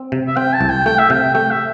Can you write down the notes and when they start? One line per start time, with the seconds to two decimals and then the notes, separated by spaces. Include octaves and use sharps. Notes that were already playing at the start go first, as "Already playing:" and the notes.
Already playing: C4
0.12 C3
0.27 E5
0.36 C4 G5
0.53 A5
0.61 C2
0.69 G5
0.86 A3 G5
0.99 E5
1.10 C3 G5
1.34 A3 G5
1.51 E5